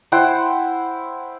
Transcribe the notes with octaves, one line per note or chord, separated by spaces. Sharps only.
E4 C5 F#5 G5